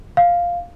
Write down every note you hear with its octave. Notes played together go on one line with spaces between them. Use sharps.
F5